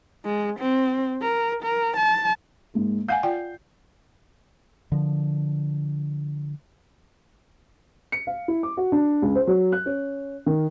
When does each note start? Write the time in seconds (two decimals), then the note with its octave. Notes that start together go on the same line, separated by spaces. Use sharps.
0.25 G#3
0.59 C4
1.21 A#4
1.63 A#4
1.97 A5
2.74 G#2 G#3 A#3
3.08 F5 F#5 G#5 G6 C7
3.23 F4 D5 G5
4.92 D3 F3
8.12 C#7
8.27 F5
8.48 E4
8.63 D6
8.77 F#4
8.92 D4
9.22 C#2
9.35 C5
9.47 F#3
9.72 F#6
9.86 C#4
10.46 D#3